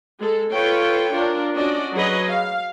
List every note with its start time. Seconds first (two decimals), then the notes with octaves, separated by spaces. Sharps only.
0.21 G#3 A4
0.52 F4 A4 B4 C#5 G5
1.12 D4 F4 A#4
1.55 C#4 D4 F#4 D5 D#5
1.93 F#3 G#4 B4 D#5
2.29 F5